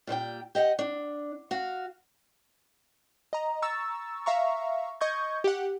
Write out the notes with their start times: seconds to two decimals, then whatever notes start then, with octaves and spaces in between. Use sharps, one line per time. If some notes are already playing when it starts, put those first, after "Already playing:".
0.07 A#2 G3 C5 G5
0.55 G4 D#5 F5 F#5
0.79 D4
1.51 F#4 F5
3.33 D#5 A#5
3.62 A#5 C#6 E6 A6
4.26 E5 F5 A#5 C#6
5.01 D#5 C#6 G6 G#6
5.44 G4 F#5